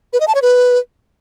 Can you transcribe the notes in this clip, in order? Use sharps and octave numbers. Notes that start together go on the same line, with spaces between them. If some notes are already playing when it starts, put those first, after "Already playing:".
B4
D#5
A5
C#5
B4